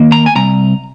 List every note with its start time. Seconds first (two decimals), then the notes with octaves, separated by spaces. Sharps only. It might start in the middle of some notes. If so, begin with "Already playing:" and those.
Already playing: D#3 A#3
0.12 A#5
0.26 G#5
0.36 C2 A#5